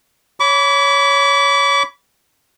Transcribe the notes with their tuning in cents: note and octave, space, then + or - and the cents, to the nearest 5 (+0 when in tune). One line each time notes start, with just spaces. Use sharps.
C#5 +10 B5 +0 D6 -35